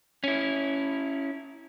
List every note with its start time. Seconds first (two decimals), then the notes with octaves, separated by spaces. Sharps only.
0.24 C#4 E4